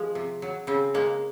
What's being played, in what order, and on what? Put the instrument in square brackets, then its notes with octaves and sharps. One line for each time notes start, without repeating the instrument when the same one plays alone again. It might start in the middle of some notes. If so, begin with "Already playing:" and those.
Already playing: [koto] F3 G#3
C3
F#3
C#3 C4
G#3 A#3